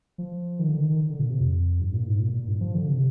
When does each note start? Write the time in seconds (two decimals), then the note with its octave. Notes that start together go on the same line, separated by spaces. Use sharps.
0.18 F3
0.59 D#3
0.69 D3
0.79 D#3
0.90 D#3
1.10 D3
1.19 A#2
1.30 C3
1.40 F2
1.81 G2
1.94 A#2
2.07 G#2
2.20 A#2
2.34 A#2
2.48 G2
2.61 F3
2.75 D3
2.88 C3